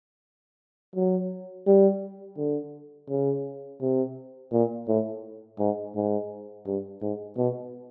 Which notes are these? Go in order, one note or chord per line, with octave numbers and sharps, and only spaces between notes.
F#3
G3
D3
C#3
C3
A#2
A2
G#2
G#2
G2
G#2
B2